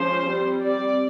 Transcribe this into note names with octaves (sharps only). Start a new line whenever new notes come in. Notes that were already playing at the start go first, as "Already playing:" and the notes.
Already playing: F3 G#3 C#4 C5
G3 C4
D5